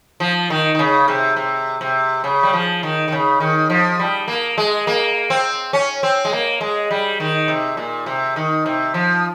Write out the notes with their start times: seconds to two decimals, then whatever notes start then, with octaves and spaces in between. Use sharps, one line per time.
0.20 F3
0.50 D#3
0.75 D#3
0.79 C#3
1.08 C3
1.37 C3
1.81 C3
2.24 C#3
2.43 G3
2.53 F3
2.83 D#3
3.08 D#3
3.12 C#3
3.40 D#3
3.70 F3
3.99 G3
4.28 A#3
4.58 G#3
4.87 A#3
5.30 C4
5.73 C#4
6.03 C4
6.25 G#3
6.33 A#3
6.61 G#3
6.91 G3
7.20 D#3
7.48 C3
7.77 A#2
8.06 C3
8.36 D#3
8.66 C3
8.94 F3